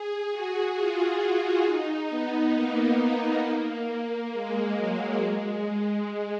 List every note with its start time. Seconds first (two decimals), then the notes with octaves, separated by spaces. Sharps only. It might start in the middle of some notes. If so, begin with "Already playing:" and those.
Already playing: G#4
0.31 F#4
0.76 F4
1.21 F4
1.65 D#4
2.10 B3
2.55 A#3
4.33 G#3
4.78 F#3
5.22 G#3